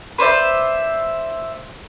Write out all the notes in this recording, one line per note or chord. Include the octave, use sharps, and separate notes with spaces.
B4 C5 D5 E5